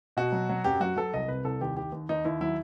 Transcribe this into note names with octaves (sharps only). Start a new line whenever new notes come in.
B2 F#4
F#3
F#3
F#2 G4
F#3 F#4
F#3 A4
C2 D#5
C3 B4
C2 A4
D#2 G4
D#3 G4
D#2
D#2 D#4
D#2 E4
F#3 E4